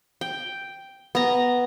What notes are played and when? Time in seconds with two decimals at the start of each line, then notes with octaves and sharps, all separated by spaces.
0.21 G5
1.15 B3 A#5